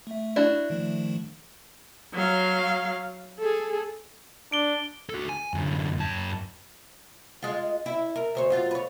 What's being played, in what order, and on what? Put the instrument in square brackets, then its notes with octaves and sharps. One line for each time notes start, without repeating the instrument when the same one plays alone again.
[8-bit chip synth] A3 E5
[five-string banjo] D4 E4 F#4
[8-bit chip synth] D#3 F3 A3
[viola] F#3 F5
G#4 A4
[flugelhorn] D4 [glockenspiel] D7 G7
[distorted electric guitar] F#4 A4
G#5
F#2 D3
F#2 A5
[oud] G#3 F4
E4
A#4
D2 C5 C#5
F#2 F4
B4 C#5